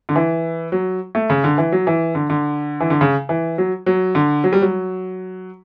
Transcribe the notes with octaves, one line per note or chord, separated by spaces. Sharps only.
D3
E3
F#3
A3
C#3
D3
E3
F#3
E3
D3
D3
E3
D3
C#3
E3
F#3
F#3
D3
F#3
G3
F#3